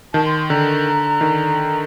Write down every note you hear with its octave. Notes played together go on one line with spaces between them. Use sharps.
D#3 A5
C6
D3 A#5
D#3